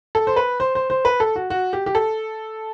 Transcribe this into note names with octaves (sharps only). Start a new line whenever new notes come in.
A4
C5
B4
C5
C5
C5
B4
A4
F#4
F#4
G4
G4
A4